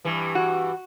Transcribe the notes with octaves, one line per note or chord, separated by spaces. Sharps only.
G2 E3
F#4